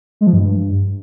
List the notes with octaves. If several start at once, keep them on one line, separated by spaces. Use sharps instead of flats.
G#3
F3
G2